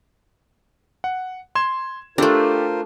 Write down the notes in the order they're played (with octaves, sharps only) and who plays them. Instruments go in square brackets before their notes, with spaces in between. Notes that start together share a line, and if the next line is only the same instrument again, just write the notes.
[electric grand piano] F#5
C6 G#6 E7
[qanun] A3 D4 [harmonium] F4 A#4 C5 [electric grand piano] G4 A4